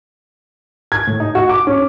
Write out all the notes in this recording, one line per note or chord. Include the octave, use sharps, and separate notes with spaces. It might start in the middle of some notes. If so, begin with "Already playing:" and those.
G#6
A2
D#4
F#4
D6
C#4